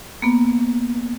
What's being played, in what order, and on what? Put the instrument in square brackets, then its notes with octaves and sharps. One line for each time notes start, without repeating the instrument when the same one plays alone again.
[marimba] A#3 B3